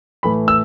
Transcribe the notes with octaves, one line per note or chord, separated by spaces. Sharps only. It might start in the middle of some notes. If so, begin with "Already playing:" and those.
A2 E3 A3 B5
E6